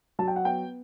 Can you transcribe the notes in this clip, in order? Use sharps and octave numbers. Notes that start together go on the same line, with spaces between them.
F#3 A5
G5
F#5
B3 G5